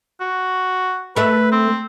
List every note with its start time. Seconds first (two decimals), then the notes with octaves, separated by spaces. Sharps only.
0.21 F#4
1.16 A3 B4 E5
1.52 C4